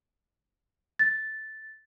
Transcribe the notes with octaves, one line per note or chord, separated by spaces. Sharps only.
A6